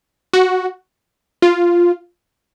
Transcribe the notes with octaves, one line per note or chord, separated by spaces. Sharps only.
F#4
F4